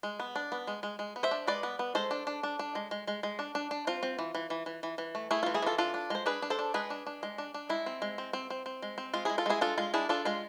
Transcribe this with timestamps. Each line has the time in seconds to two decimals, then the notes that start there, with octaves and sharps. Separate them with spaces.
0.03 G#3
0.20 B3
0.36 D4
0.52 B3
0.67 G#3
0.83 G#3
0.99 G#3
1.16 B3
1.23 C5 E5
1.31 D4
1.47 G#3 B4 D5
1.63 B3
1.79 B3
1.95 G#3 A4 C5
2.11 D4
2.27 D4
2.43 D4
2.59 D4
2.75 G#3
2.91 G#3
3.07 G#3
3.23 G#3
3.39 D4
3.55 D4
3.71 D4
3.87 C4 F4
4.03 C4
4.19 E3
4.35 E3
4.50 E3
4.66 E3
4.83 E3
4.98 E3
5.15 A3
5.31 A3 E4 G#4
5.43 E3 F4
5.54 E4 G#4
5.62 E3 F4 A4
5.78 D4 F4 A4
5.94 D4
6.10 G#3 C5
6.26 D4 G#4 B4
6.42 D4
6.50 A4 C5
6.59 D4
6.74 G#3 G#4 B4
6.90 D4
7.07 D4
7.23 G#3
7.38 D4
7.54 D4
7.69 G#3 E4
7.86 C4
8.02 G#3
8.18 C4
8.33 C4
8.50 C4
8.66 C4
8.82 G#3
8.98 C4
9.14 G#3 F4
9.25 G#3 E4 G#4
9.38 F4 A4
9.46 G#3 E4 G#4
9.61 D4 F4 A4
9.78 G#3 F4
9.94 D4 E4 G#4
10.09 D4 F4 A4
10.25 G#3 F4